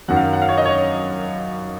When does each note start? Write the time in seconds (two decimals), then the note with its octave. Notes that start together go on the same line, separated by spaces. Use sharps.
0.08 F#2 D#3 F#3 F#5
0.16 F5
0.33 F#5
0.42 F5
0.49 C#5
0.58 D#5
0.66 C#5